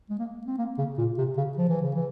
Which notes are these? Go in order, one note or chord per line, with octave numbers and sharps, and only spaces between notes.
G#3
A#3
C4
A#3
C#3
A#2
C3
C#3
F3
E3
C#3
E3